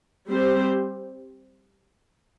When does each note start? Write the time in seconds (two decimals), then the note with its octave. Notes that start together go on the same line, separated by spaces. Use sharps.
0.31 G3 C4 G4 C5